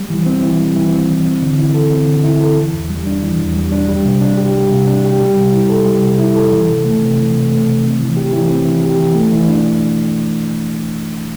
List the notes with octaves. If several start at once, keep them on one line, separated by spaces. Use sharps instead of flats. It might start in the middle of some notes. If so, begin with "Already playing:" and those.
Already playing: G3
E3
C4
E3
G3
E3
C4
E3
C4
D3
E4
A4
C4
D3
E4
A4
E3
E2
G3
D4
E3
E2
G3
D4
G3
C3
D4
G4
G3
C3
D4
G4
G3
C3
E4
A4
G3
C3
E4
A4
E3
C3
A3
C3
E3
C3
A3
C3
C4
E3
G4
E3
C4
E3
G4
E3
A3
E3
D4